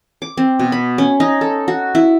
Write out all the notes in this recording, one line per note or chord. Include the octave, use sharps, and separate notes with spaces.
D6
C4
B2
B5
C#4
D#4
A4
F#4
E4